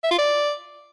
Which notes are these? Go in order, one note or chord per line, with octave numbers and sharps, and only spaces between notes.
E5
F4
D5